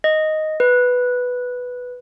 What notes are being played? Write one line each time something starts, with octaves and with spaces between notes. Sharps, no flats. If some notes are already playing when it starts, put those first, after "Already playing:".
D#5
B4